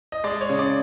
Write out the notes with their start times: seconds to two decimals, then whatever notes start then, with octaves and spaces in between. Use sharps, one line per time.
0.12 D#5
0.24 G#3 D5
0.41 C#5
0.49 C#3
0.59 D5